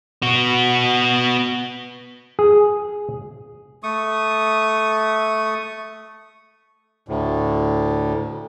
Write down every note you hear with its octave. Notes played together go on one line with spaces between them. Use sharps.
B3 F#4
G#4
A3 C#6 D#6
D2 A2